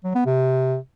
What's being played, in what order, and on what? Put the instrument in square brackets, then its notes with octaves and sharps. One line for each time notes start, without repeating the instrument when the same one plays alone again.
[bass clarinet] F#3
B3
C3